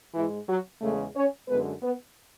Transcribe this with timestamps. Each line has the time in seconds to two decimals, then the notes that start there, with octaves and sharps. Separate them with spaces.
0.14 G#2 E3 G#3 E4
0.48 F#3 F#4
0.81 E2 C#3 G#3 A3 A4
1.15 C#4 C#5
1.48 F#2 D3 G#3 B3 B4
1.82 B3 B4